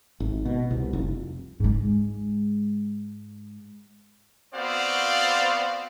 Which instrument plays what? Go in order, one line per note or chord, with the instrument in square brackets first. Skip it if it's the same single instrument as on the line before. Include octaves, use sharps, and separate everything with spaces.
[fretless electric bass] G#1
B2
C2
F1
[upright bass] G#2 G#3
[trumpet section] B3 C4 F#4 C5 D5 F5